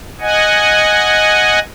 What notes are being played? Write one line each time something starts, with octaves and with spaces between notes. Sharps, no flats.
D#5 F#5 G#5